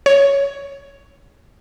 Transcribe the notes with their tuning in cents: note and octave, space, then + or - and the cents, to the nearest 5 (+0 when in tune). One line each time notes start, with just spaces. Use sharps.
C#5 +5